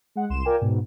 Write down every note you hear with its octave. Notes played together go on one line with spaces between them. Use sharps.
G#3 F#5
C2 C6 E7
F4 A#4 D5 G5 G#5
G#2 B2